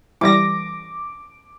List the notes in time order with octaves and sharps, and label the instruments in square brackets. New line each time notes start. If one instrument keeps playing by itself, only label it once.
[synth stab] E3 G3 A#6 [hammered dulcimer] D6